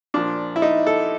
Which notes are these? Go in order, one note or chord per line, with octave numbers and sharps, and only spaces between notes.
A#2 F3 D4
E4
D#4
A4